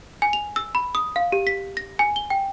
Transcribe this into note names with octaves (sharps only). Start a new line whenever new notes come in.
G#5
F7
E6
B5
D#6
F5
G4
B6
A#6
G#5
G7
G5